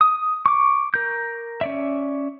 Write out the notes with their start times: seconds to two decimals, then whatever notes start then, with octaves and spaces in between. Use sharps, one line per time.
0.01 D#6
0.46 C#6 D6
0.94 A#4 G6
1.61 C#4 D5 E5